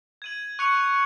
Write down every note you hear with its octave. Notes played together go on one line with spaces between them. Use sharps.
G#6 D#7 F#7
C#6 F#6 C#7 F7